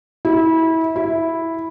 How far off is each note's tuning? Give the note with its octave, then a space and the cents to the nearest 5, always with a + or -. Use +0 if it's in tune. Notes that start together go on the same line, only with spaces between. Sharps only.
E4 -25
E4 -5